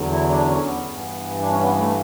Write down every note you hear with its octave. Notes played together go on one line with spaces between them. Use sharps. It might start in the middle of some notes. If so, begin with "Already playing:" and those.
Already playing: E2 D3 F#3
E4
D4
C#4
B3
G2 E3
D4
C#4
B3
A3